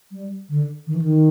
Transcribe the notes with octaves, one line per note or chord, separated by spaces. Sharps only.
G3
D3
D#3
E3
D#3